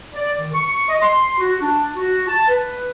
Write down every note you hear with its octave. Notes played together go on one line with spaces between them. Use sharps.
D5
D#3
C#6
D#5
C6
F#4
D4
F#4
A5
B4